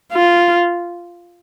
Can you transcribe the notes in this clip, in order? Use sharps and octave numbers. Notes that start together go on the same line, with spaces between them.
F4